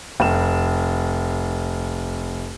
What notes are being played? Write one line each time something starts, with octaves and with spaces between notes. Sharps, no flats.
F1 E7